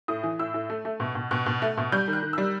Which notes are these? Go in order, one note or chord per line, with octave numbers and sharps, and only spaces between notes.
A2 D#6
E3
A2 E6
A2
A3
A3
B2
B2
B2 F#6
B2
A3
B2
G3 G6
D#3
F#6
D#3
G3 E6